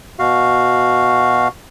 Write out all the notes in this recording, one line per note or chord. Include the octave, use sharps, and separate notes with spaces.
B2 F#4 F5